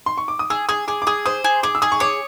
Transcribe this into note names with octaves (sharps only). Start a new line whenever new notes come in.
C6
C#6
D6
D#6
G#4 E6
G#4 D#6
G#4 D6
D6
G#4 D#6
C5 D#6
G#4
G#4 D6
E6
G#4 D#6
C#6
C#5 D6